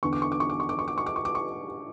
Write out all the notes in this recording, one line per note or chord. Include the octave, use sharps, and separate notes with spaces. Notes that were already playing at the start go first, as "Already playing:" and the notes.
E2 D3 C#6
D6
C#6
D6
C#6
D6
C#6
D6
C#6
D6
C#6
D6
C#6
D6
C#6